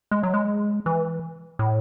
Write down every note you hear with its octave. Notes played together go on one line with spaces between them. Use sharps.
G#3
F#3
G#3
E3
A2